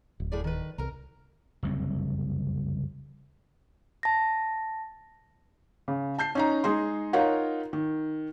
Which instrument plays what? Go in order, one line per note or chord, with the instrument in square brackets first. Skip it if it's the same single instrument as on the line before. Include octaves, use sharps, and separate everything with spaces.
[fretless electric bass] D1
[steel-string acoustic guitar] A2 G#4 D5
D#3 B4
[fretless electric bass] C2 [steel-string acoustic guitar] A#4 A#5
[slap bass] F#1 C2 F2
[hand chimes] A5 A#6
[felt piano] C#3
A5 G6 C7
C#4 D#4 A#5
G#3 D#4 G#4 C6
D#4 F4 A#4 C#5 F#5
D#3